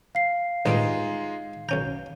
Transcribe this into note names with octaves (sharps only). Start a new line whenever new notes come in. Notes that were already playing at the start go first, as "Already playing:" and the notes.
F5 C7
A1 G2 G3 G#3 D#4 F4
B1 C#4 A#5 G6